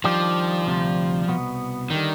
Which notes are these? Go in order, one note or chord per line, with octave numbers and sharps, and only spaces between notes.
D#3 F3 G3 D4 G4
D2 C3 G3
C2 B2 B3
D3 D#3 G3